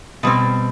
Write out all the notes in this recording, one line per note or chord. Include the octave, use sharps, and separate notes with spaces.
B2 G3 C4